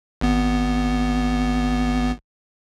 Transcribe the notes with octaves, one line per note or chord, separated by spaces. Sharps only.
G#1 B3